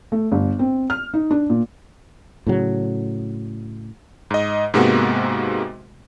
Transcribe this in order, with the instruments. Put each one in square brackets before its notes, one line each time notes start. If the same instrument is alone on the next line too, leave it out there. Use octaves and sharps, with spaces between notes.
[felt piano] A3
G1
C4
F6
D#4
D4
A#2
[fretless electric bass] A2 C#3 F#3
[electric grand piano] G#2 D#5
G#2 C3 G#3 A#3 B3 F#4